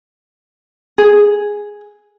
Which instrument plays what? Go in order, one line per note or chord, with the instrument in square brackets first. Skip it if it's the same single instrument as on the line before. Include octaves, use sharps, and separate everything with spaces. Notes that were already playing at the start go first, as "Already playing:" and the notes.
[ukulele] G#4